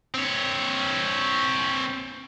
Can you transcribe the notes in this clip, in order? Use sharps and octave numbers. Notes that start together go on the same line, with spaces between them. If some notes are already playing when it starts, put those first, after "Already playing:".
C4 C#5